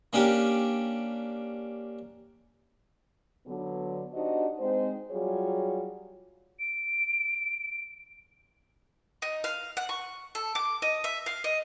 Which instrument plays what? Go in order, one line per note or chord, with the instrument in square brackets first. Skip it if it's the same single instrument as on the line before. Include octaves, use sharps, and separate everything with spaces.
[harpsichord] A#3 C#4 D4 G4 A#4
[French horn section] D3 F#3 B3
D4 D#4 F#4 G4 C5 D#5
G#3 C4 D#4 C5
F#3 G3 F4 F#4 G#4 C#5
[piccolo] D7
[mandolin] D#4
F5
F#5
C#6
A4
D6
D#5
E5
F5
D#5